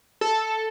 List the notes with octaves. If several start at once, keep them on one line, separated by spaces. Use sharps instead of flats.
A4